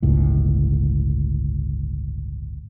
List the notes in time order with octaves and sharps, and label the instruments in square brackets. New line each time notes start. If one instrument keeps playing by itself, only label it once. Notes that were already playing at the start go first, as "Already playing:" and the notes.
[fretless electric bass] G1 C#2 A2